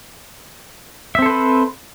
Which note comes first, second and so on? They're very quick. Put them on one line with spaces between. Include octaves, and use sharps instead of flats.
E5 C4 A4 C5 B4